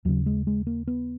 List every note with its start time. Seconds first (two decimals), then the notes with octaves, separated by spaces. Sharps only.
0.05 D#2 C#3 F#3
0.26 G#3
0.47 G#3
0.67 A#3
0.87 B3